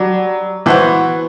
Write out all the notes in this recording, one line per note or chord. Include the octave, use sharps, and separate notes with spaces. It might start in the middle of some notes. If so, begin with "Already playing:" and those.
Already playing: F#3 G3 D4
E3 B3 F#4 C5